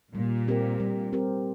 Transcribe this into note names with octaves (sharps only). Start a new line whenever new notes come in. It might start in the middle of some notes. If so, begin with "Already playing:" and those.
A#2 G3
C4 G4 A#4
G3
C4 G4 A#4